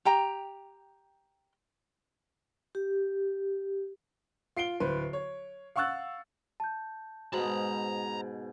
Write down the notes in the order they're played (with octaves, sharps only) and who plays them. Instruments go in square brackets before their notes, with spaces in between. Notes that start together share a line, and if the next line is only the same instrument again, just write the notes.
[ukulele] G4 G5 A#5
[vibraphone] G4
[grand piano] F4 C7 D7 G7
D1 B4 C5
C#5
F5 F#5 C#6 E6 F#6 A6
[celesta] A5 G6
[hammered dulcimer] G#2 B2 [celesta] F#4 C5 F#7 [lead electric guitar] A5 A#5